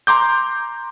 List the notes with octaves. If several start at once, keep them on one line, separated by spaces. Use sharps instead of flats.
A#5 C6 D6 G6